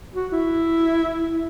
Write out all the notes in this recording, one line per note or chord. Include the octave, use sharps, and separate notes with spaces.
F#4
E4